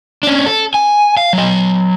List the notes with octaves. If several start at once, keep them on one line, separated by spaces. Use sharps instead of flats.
C#4 D4
A4
G#5
F5
F#3 D#5